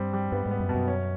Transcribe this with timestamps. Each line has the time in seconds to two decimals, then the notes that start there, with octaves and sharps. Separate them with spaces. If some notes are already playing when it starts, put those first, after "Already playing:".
Already playing: G2 G3 C4
0.13 G3
0.32 G2 B3
0.46 G#2
0.51 B3
0.60 F#2
0.69 B2
0.74 F#2
0.88 C#4